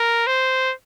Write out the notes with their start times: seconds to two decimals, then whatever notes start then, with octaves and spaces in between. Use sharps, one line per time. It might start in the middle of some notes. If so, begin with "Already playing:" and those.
Already playing: A#4
0.27 C5